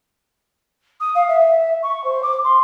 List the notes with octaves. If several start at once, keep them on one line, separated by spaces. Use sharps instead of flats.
D#6
F5
E5
C#6
C5
D6
C6